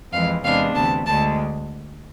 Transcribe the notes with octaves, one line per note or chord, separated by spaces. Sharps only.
F2 E3 G#3 F5
E2 C3 G#3 B3 D4 F5
D2 C3 E3 A5
D2 D3 G#3 A5